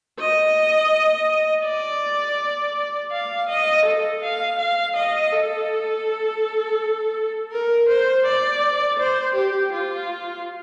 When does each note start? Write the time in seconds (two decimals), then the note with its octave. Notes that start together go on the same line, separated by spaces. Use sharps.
0.20 D#5
1.65 D5
3.12 F5
3.49 D#5
3.86 A4
4.22 F5
4.59 F5
4.96 D#5
5.32 A4
7.52 A#4
7.89 C5
8.26 D5
8.99 C5
9.35 G4
9.73 F4